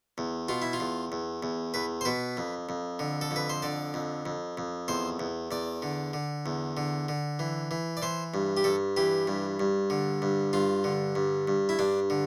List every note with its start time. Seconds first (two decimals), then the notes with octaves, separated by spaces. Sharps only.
0.18 E2
0.49 B2 F4
0.62 E4
0.73 F4
0.80 E2
1.12 E2
1.43 E2
1.74 E2 B4
2.01 C5
2.05 B2 B4
2.37 F2
2.69 F2
2.99 D3
3.21 A4
3.31 F2
3.36 B4
3.50 C5
3.62 D3 D5
3.94 F2
4.26 F2
4.57 F2
4.88 E2 C5
5.19 E2
5.51 E2 D5
5.82 D3
6.13 D3
6.46 E2
6.77 D3
7.09 D3
7.39 E3
7.71 E3
7.97 D5
8.02 E3 C5
8.34 G2
8.57 G4
8.64 G2 A4
8.97 E3 G4
9.27 G2
9.60 G2
9.90 D3
10.22 G2
10.53 G2 F4
10.84 D3
11.15 G2
11.48 G2
11.69 E4
11.79 G2 D4
12.10 D3